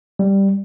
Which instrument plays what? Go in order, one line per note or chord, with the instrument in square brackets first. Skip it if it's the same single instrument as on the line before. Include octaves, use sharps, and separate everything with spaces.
[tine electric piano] G3